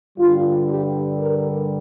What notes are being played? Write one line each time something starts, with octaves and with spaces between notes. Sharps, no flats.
G2 D3 G3 F4
G4
A#4